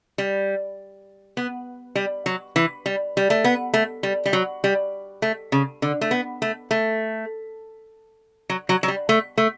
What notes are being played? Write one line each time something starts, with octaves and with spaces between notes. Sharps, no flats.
G3
B3
G3
F#3
E3
G3
G3
A3
B3
A3
G3
G3
F#3
G3
A3
C#3
D3
A3
B3
A3
A3
F#3
F#3
F#3
G3
A3
A3